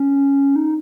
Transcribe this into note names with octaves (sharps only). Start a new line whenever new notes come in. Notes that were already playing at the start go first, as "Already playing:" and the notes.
Already playing: C#4
D#4